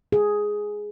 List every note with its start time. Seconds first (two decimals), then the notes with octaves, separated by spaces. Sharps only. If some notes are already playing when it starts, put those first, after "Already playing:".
0.12 G#4